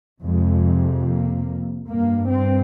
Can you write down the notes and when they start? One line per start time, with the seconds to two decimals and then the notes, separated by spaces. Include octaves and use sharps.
0.22 F2 C3 G#3
1.06 A#3
1.89 G2 A#3
2.31 C4